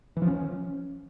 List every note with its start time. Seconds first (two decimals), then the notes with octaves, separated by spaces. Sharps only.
0.17 E3
0.22 F3
0.27 C#4